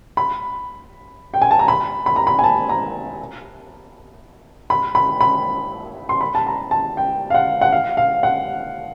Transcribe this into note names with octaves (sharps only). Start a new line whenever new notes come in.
B5
G5
G#5
A5
A#5
B5
B5
A#5
B5
G#5
A5
A#5
B5
B5
B5
C6
B5
A5
A#5
A5
G5
F5
F#5
F#5
F5
F5
F#5